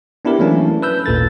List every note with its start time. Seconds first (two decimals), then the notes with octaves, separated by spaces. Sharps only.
0.25 B3 D4 E4 G4 A#4
0.39 E3 F#3 A3 A#3 C#4 D4
0.82 B4 E6 G6
1.06 G#1 D#2 A#2 A4 A6